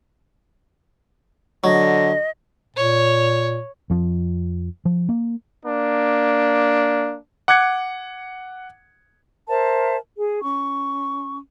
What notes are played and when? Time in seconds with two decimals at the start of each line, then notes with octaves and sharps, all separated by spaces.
1.64 D3 F#3 D#5
2.76 A#2 C#5
3.90 F2 F3
4.85 F3
5.09 A#3
5.66 A#3 D4
7.48 F#5 D6 F#6 G#6 C#7
9.49 A#4 C5 E5 A5
10.17 G#4
10.42 C#4 C#6